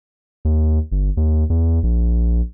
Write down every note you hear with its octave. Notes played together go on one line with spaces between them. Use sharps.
D#2
G1
D#2
E2
A#1